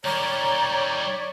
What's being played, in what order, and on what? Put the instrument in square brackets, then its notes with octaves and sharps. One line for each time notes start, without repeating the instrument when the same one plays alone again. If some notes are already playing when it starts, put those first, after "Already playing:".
[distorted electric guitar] D#3 G3 [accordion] C#5 D5 [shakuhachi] A#5